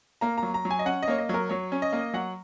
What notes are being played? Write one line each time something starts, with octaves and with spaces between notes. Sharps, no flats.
A#3 A#5
A#5
F#3
A#5
F#3
G#5
D#5
C#4 F#5
D#5
A#3 C#5
D#5
F#3 A#4
F#3 C#5
C#4
D#5
A#3
F#3 F#5